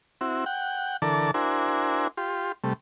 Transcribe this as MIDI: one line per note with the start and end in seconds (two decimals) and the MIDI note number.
0.21 0.45 60
0.21 0.45 64
0.21 0.45 66
0.46 0.97 78
0.46 0.97 79
1.02 1.31 50
1.02 1.31 52
1.02 1.31 69
1.02 1.31 70
1.02 1.31 74
1.02 1.31 81
1.34 2.08 62
1.34 2.08 64
1.34 2.08 66
1.34 2.08 70
1.34 2.08 72
1.34 2.08 80
2.17 2.52 65
2.17 2.52 67
2.17 2.52 84
2.64 2.73 48
2.64 2.73 55
2.64 2.73 57